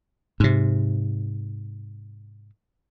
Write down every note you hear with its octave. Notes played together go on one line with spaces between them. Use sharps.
G#2 C3